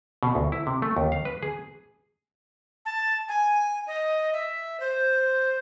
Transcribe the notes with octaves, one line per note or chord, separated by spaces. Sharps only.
B2
D2
E4
C3
A3
D#2
F5
B4
G#4
A5
G#5
D#5
E5
C5